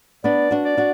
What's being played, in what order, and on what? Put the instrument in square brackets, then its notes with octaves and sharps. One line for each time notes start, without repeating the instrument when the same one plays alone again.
[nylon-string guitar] B3 D4 [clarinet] D5
[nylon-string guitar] D4 F#4
[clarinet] D5
[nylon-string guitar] D4 F#4